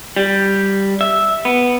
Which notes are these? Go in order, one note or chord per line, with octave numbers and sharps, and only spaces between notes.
G3
E5
B3